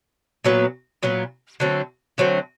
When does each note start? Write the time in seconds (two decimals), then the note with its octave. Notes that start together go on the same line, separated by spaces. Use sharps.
0.44 A#2 F#3 B3
1.03 A#2 F#3 B3
1.60 D3 F#3 A3 C4
2.18 D3 F#3 A3 C4